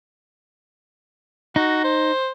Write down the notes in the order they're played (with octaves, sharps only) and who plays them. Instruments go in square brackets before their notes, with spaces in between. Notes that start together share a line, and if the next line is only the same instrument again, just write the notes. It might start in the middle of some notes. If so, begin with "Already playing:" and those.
[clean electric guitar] D#4 [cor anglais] F#4
[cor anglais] C5